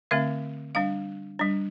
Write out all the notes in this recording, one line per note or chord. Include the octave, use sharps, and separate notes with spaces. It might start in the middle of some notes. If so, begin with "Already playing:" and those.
D3 A3 C4 E5
G3 D4 F5
G3 D4